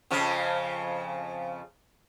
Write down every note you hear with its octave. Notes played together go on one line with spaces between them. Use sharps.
F2 C#3 F3